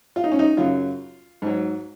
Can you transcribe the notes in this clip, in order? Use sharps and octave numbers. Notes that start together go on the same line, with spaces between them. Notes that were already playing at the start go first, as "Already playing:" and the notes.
F4
D#4
C#4
D#4
F#2 C#3 F#3 F4
G#2 F#3